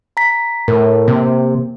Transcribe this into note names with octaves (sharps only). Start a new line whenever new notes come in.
A#5 B6
A2 A#4
C3 A#3